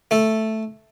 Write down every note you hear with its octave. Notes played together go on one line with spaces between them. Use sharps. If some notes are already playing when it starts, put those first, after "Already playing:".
A3 A4